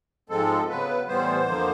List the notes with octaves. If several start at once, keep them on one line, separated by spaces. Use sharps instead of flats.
G#2 F3 G#3 C4 A4
C#3 F#3 B3 B4
A2 E3 G3 B3 C5
F2 D3 F3 A#3